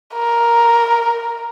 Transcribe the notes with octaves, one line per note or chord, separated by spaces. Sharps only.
A#4